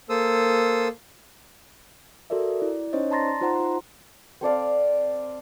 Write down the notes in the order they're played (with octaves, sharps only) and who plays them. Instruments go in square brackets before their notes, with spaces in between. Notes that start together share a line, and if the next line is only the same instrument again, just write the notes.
[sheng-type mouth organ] A#3 A4 C5 D#6 E6
[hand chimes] F#4 A4 A#4 D5 E5
E4 D5
C#4 D#4 C5 C#5 D#5
D5 A5 A#5 C6 A6 A#6
D#4 F4 C5 F#5 A#5 C6
F4
[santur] C4 A4 D5 F5